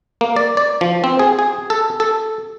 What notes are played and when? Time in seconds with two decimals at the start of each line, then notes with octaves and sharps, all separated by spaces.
0.21 A#3
0.36 D5
0.57 D5
0.81 F3
1.04 C4
1.19 G#4
1.39 G#4
1.70 A4
2.00 A4